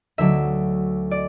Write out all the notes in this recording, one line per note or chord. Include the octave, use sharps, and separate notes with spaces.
D2 D3 F#3 D4 E5
D5